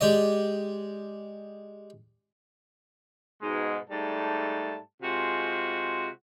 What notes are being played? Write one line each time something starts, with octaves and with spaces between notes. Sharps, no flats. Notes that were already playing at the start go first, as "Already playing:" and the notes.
G#3 G4 D5 D#5
G#2 B2 G#3
G#2 G3 A3 A5
C3 G#3 F4 F#4 G#4 C5